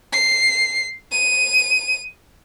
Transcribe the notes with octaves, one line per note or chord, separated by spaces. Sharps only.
C7
D#7